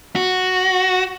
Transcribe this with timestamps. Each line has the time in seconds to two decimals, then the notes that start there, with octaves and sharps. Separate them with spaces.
0.15 F#4